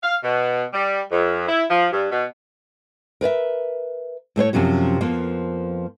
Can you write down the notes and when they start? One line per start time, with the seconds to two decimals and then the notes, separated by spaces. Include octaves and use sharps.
0.03 F5
0.23 B2
0.74 G3
1.12 F2
1.48 E4
1.70 F3
1.93 G2
2.11 B2
3.21 A#4 B4 D5 E5
4.36 A2 A3 C5 C#5
4.53 F#2 C3 F3 C#4 F#4
5.01 F2 F3 A#3 B3